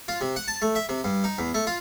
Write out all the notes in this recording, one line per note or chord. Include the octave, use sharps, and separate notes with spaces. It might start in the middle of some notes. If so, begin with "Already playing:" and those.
F4
C3
F#5
A5
A3
E5
C3
G2
D#4
E2
A3
F4